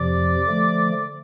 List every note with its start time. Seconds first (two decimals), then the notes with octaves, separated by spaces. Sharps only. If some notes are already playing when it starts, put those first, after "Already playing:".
Already playing: F2 C3 F3 D5
0.47 D3 F3 A3